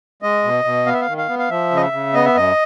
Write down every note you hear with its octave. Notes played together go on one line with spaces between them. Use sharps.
G#3 D#5
B2
B2
B3 F5
E5
F5
D#3
F5
B3
F5
F3 E5
C#3
D#5
E5
C#3
B3 D#5
E5
F#2 D#5